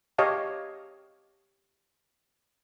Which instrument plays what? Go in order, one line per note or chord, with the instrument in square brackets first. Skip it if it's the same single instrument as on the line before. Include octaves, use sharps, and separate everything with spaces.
[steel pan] G4 C#5 D#5 F5 A5